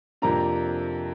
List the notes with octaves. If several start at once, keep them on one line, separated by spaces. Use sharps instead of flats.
F2 C3 A#3 D4 A#5